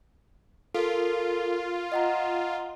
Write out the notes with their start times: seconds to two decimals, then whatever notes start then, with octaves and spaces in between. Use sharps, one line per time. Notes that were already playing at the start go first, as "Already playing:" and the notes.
0.74 F4 A4 A#4
1.92 D#5 F#5 A#5